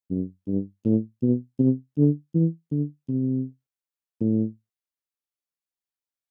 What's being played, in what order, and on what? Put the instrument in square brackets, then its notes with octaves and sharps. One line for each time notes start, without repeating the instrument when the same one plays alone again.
[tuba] F#2
G2
A2
B2
C3
D3
E3
D3
C3
A2